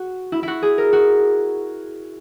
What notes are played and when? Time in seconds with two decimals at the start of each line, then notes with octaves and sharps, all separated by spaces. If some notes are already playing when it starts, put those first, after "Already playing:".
Already playing: F#4
0.32 E4
0.43 E4 F#4
0.63 G#4
0.78 A#4
0.93 F#4